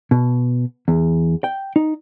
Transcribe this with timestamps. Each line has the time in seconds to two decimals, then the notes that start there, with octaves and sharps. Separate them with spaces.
0.11 B2
0.88 E2
1.44 G5
1.76 D#4